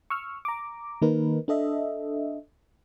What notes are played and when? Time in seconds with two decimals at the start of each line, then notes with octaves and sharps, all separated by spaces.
0.10 C#6 E6 F6
0.45 A#5 D6
1.02 D#3 A#3 D#4 A#4 B4
1.48 D4 A4 D#5 E5